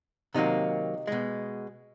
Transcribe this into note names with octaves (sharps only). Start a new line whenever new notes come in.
C3 D#3 F#3 A#3 D#4
B2 G#3